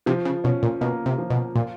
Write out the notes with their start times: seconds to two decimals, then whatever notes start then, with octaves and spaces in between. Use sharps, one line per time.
0.06 C3 F3
0.25 C#3
0.44 B2 C#4
0.63 A#2
0.81 B2 A#3
1.06 C3
1.18 F3
1.30 B2
1.55 A#2 F4